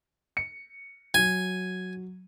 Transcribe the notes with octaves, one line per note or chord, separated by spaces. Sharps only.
C#7
F#3 G#5